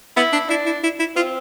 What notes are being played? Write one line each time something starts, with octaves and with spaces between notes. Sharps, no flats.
B3 E4
D4
D4 E4
E4
E4
E4
C4 F4